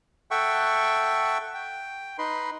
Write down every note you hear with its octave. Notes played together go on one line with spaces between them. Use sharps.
A4 E5 F#5 G5 C#6
G5
D#4 B4 C6